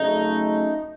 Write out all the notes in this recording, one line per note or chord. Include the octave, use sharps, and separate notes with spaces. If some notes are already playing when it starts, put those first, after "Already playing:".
Already playing: C#3 F#3 A3 D#4